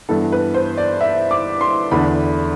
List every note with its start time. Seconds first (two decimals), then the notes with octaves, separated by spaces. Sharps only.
0.09 G2 E3 B3 A4
0.32 B4
0.54 C5
0.77 D5
1.01 E5
1.31 D6
1.61 C6
1.91 E2 D3 A3 D4 B5